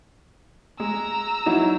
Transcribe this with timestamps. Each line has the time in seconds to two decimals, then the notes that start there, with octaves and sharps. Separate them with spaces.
0.80 G#3 A#5 E6
1.46 F#3 D#4 E4